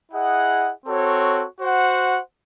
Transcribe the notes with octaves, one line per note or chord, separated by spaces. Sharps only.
E4 G#4 D#5 F#5
C4 F#4 A4 C#5
F#4 C5 F#5